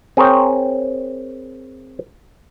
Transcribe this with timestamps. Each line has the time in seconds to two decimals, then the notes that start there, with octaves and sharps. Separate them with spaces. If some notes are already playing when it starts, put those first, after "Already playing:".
0.17 C4 G#4 A#4 C5 C#5 G5